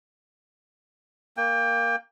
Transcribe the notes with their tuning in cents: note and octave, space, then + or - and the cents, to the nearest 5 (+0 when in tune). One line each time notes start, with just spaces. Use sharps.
A#3 +0 G5 +30